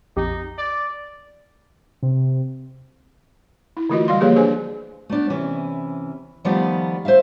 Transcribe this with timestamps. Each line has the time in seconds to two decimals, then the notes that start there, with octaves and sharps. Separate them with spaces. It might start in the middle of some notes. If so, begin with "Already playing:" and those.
0.17 A#1 F2 D#4 G4
0.58 D5
2.03 C3
3.77 E4
3.90 D3 E3 A3 F4 F#4 D#5
4.08 G3 D5 F5 C6
4.20 F3 A#3 G4 G#4 B4 C#5
4.36 D4 G#4 B4 C5 G#5
5.10 A3 B3 D4
5.30 C3 E3 C#4
6.44 D#3 F3 G3 A3 B3 D5
7.05 C5 D5 E5 F5